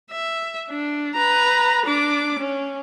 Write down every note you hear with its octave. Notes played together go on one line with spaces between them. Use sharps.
E5
D4
B4 A#5
D4 D6
C#4